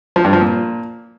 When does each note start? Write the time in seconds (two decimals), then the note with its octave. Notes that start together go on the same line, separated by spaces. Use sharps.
0.16 F3
0.24 G2
0.33 F3
0.41 A#2